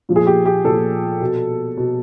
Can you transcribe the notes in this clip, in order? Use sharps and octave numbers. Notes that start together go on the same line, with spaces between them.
A#2 F3
G#4
G4
G4
A#2 F3 A4
B2
B2